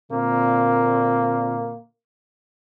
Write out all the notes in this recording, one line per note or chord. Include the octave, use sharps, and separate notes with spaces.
A#2 D3 A#3 C4